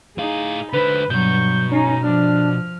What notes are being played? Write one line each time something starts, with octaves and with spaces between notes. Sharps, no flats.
A2 D#4 G#4 F5
D3 B4 C5 B5
G2 B2 F#3 C#6 G6
C#4 D#4
F3 D4 F6